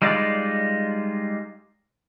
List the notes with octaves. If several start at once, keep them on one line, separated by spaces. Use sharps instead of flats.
G3 G#3 D#4 F4 D5